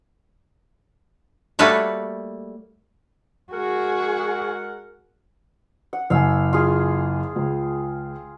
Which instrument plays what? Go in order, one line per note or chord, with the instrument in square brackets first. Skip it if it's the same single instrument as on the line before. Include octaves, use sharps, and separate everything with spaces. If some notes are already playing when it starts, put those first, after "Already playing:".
[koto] G3 A3 A#3 F#4 B4 C#5
[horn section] G#3 A#4 F#5 [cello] F#4 G#4
[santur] F#5
[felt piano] F#1 G#5 [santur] F5 E6
[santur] F4 G#4
[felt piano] C#2